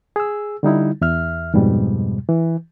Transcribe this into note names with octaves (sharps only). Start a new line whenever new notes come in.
G#4 E6
D3 G3 D#4 E4
E2 E5 F6
F2 G#2 B2 G3
E3